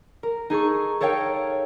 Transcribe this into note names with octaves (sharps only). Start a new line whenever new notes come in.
A#4
D#4 G#4 A4 C#6
A4 A#4 C#5 F5 G5